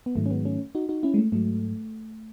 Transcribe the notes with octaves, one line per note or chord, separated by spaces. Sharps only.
B3
G#2 D#3 F#3 A3
C#4
G#3 B3
A3 C#4
D#4 F#4
D#4 F#4
C#4 E4
G#3
A3
G#2 F#3 A3